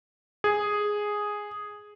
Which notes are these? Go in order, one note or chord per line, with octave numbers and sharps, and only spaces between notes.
G#4